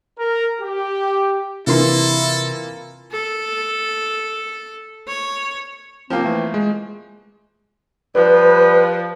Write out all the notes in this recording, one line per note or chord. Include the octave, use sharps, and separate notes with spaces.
A#4
G4
C3 E3 A#3 E4 F4 A4 C6
A4
C#5
F3 A#3 C4
E3 A3
G#3
F3 G3 B4